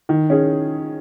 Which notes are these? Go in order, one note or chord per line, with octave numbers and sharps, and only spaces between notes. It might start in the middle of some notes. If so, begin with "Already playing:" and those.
D#3
C#4 G#4